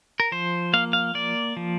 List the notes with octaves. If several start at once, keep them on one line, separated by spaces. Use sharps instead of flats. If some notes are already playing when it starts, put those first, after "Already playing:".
A#4
F3 C5
A#3 F5
F5
A#3 D5
F3